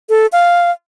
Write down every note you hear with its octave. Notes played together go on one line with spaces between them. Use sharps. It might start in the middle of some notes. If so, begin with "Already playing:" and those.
A4
F5